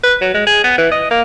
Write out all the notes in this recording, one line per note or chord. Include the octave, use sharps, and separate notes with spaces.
B4
F#3
G#3
G#4
B3
E3
D#5
A#3